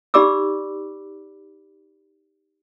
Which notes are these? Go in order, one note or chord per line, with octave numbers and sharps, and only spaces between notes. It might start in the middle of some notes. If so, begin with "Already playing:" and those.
D#4 G4 D5 B5 D6 E6